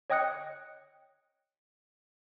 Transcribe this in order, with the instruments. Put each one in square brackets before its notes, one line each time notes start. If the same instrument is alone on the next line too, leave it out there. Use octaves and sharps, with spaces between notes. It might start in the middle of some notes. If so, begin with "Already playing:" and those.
[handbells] C#5 D#5 G5 D#6 F#6 C#7